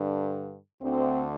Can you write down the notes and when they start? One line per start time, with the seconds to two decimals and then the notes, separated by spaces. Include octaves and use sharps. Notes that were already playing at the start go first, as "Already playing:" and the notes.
Already playing: G2 D3
0.82 D2 D3 C4